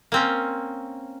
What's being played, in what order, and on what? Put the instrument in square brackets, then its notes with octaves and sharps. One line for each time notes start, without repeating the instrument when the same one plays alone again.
[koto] A#3 C4 C#4